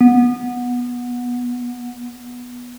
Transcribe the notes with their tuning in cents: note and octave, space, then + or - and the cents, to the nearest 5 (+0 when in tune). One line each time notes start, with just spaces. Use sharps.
B3 -15